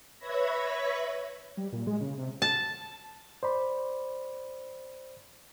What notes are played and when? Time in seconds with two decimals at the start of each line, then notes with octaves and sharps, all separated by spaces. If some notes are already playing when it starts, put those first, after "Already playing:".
0.19 B4 C#5 E5 B5 G#6 A#6
1.57 G3
1.73 A#2
1.87 G#3
2.01 C#3
2.18 C3
2.42 A5
3.43 C5 D5 B5